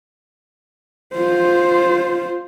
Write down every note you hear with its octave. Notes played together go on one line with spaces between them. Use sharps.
F4 C5